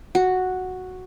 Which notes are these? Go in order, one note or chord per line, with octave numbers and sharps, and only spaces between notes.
F#4